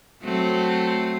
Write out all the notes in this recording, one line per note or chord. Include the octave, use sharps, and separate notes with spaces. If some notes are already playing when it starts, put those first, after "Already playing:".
F#3 A3 C4